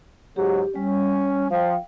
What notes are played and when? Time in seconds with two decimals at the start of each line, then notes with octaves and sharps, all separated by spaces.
0.36 G#2 C#3 F#3 G4
0.76 G3 C#4
1.51 F3 F5 G5